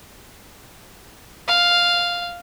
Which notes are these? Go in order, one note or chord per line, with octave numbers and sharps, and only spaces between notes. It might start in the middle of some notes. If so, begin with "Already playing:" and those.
F5